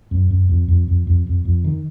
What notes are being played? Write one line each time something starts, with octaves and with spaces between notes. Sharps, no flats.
F#2
F#2
F2
F2
F2
F2
F2
F2
D#3